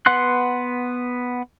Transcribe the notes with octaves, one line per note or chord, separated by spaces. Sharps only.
B3 B4 F#5 C6 F#6